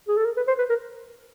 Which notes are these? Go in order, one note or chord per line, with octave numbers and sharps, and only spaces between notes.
G#4
A4
A#4
B4
C5
B4
A#4